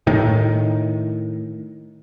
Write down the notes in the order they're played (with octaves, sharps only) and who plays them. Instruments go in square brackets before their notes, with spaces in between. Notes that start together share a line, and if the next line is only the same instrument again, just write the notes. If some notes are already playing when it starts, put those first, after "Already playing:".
[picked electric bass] A2 D#3